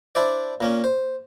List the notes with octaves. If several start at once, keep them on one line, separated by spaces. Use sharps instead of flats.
D4 E4 C5 D5
A#2 A#3 C#4
C5